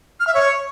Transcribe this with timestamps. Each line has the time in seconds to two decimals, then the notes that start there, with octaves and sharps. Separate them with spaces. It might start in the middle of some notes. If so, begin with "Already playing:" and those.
0.20 F6
0.27 E5
0.34 C#5